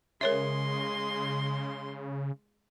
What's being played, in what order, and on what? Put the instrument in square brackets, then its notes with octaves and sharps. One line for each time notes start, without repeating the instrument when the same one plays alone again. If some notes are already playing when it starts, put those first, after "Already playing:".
[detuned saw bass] C#3 [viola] G#3 C6 [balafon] A#4 C#5 E5